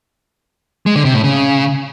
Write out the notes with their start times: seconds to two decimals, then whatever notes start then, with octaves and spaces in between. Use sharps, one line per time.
0.86 G#3
0.96 D3
1.05 C3
1.14 A2
1.24 C#3